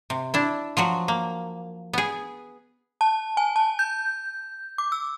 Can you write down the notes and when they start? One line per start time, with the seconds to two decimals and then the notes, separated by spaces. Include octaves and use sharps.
0.10 C3
0.34 D4 E4
0.77 F3 F#3 F#4 F#5
1.08 A#3
1.93 B3 G#4
3.01 A5
3.37 G#5
3.56 A5
3.79 G6
4.78 D6
4.92 E6